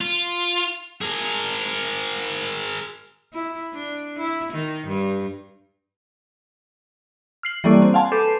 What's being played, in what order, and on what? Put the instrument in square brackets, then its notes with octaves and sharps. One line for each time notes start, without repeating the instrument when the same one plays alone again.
[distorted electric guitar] F4
G#4 A#4
[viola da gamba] E4
D4
E4
D#3
G2
[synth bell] F6 C7 F#7
E3 G3 A#3 C#4 A4 D5
C4
F5 F#5 G#5 A5 C6
A4 B4 D6 G6 C7 E7